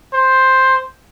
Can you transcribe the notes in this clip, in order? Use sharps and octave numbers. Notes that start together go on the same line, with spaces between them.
C5